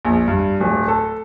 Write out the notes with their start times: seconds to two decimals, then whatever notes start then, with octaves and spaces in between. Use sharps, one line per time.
0.05 A#1
0.28 G2
0.60 D1
0.88 A4